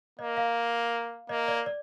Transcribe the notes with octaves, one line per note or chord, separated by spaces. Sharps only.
A#3 D#5
F5
A#3 D#5
D5
D5